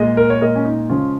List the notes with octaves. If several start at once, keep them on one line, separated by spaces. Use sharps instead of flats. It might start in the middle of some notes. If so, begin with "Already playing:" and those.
Already playing: A#2 G#3 D#5
A#4
C#5
A#2 G#3 A#4 D#5
C#4
D#4
C#3 F3 G#3 C#4 F4